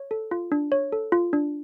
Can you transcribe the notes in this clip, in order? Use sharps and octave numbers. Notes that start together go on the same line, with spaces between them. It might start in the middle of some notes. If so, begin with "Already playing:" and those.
Already playing: C#5
A4
F4
D4
C#5
A4
F4
D4